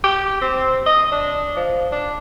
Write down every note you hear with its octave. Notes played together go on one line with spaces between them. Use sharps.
G4
C4
D#5
D4
F3
D4